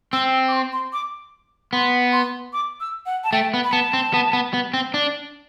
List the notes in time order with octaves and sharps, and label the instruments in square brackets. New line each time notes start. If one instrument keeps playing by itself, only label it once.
[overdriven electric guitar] C4 [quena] E6
[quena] E6
D6
C6
C6
D6
[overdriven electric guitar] B3 [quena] C6
[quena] C6
D6
E6
F#5
A5
[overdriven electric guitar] A3 [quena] G5
[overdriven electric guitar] B3
[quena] B5
[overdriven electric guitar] B3 [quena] A5
[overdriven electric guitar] C4
B3
B3
B3
C4
D4